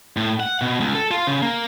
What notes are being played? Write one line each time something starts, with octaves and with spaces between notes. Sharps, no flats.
A2
F#5
B2
C#2
A4
F4
C#3
A#3